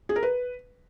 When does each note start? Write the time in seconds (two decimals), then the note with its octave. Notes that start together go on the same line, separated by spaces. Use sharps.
0.09 G#4
0.16 A#4
0.23 B4